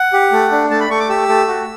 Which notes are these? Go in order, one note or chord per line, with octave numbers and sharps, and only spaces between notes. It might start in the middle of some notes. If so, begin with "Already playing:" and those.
Already playing: F#5
G4
A3
D4
A3 A5
B5
A3 C#6
D6
G4 E6
A3
F#4